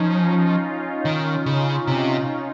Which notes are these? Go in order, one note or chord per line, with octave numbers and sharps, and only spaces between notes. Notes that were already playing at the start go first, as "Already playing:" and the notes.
Already playing: F3 C#4 D#4
F4
D#3
C#3
C3